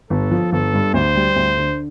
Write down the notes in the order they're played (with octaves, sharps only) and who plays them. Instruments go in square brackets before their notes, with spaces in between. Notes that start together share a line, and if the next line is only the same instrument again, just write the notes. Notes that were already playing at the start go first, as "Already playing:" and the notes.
[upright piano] G1 [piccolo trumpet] A4
[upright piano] F3
[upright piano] G1 [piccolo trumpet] A4
[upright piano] G2
[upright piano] D2 [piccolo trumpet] C5
[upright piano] G3
D2
D3